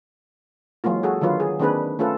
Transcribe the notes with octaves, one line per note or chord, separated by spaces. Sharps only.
E3 F#3 G#3 A#3 F4
F#4 G#4 A4
D3 D#3 F#3 F4 B4 C#5
G#4
D#3 A#3 C4 D4 G#4 B4
A3 C#4 F4 A4 B4